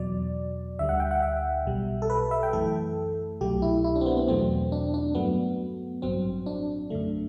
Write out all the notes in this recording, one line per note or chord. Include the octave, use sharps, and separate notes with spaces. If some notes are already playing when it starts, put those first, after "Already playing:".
Already playing: E2 B2 F#3 D5
D2 D3 G3 E5
F#5
G5
F#5
E5
B1 B2 G3
A4
B4
E5
G5
F#2 E3 A3 A4
C2 B2 F#3 A3 G4
E4
E4
D4
C4
B3
C4
E2 B2 F#3 A3 C4
D4
D4
G2 F#3 A3 B3
A1 G2 F#3 C4
D4
F#2 D3 A3